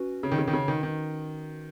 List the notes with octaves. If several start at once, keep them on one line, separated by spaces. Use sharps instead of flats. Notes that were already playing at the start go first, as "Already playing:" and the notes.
Already playing: C#4 F#4 B4
C#3
D#3
C#3
D#3
C#3
D#3
D#3